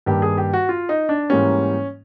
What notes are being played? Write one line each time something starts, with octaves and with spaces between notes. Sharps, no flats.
G2 D#3 G3 A#3 G4
G#4
G4
F#4
F4
D#4
D4
G#2 E3 G3 A#3 C#4